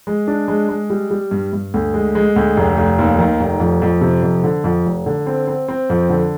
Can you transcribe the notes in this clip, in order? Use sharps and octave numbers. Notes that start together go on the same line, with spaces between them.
G#3
D4
G#3
G#3
G3
G3
G2
G2
D2
G#3
G#3
D2
F1
F1
D#2
D#3
F1
F2
F2
C3
F2
D3
F2
F1
D3
C4
C4
C4
F2
D3